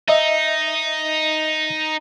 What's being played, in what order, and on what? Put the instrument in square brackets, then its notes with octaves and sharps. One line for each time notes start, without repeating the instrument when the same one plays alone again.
[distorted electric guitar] D#4 [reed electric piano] D#5 E5